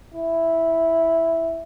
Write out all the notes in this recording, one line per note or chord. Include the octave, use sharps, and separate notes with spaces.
E4